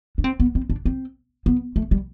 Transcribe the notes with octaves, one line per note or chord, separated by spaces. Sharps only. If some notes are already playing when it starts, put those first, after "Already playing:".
D4
C4
B3
C4
D4
C4
B3
A3
G3